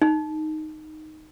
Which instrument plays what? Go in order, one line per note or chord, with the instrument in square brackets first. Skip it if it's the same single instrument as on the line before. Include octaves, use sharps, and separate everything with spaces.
[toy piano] D#4